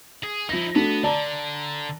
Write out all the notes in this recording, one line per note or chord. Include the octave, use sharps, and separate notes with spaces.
G#4
F3 D#4 E4 A#6
A3 B3 D4 F#4
D3 D5 A5 A#5